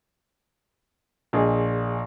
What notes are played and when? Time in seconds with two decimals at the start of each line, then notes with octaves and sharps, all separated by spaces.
1.33 A#1 G#4 D#5